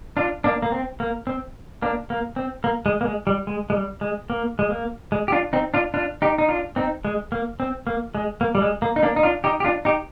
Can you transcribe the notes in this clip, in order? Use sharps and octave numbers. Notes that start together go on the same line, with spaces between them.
D4 F4
A#3 D4
A#3
C4
A#3
C4
A#3 D4
A#3
C4
A#3
G#3
A#3
G#3
G3
G#3
G#3
G3
G#3
A#3
G#3
A#3
G#3
G4
D4 F4
C4 D#4
D4 F4
D4 F4
D#4 G4
D#4
D4 F4
C4 D#4
G#3
A#3
C4
A#3
G#3
A#3
G3
G#3
A#3
D#4
A#3 D4
D#4
D4 F4
D#4 G4
G4
D4 F4
D#4 G4